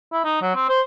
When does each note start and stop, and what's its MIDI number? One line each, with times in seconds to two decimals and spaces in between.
0.12 0.21 64
0.24 0.40 63
0.41 0.55 54
0.55 0.67 60
0.69 0.81 72